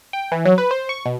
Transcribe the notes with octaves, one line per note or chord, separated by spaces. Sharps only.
G5
E3
F#3
B4
C5
C#6
B2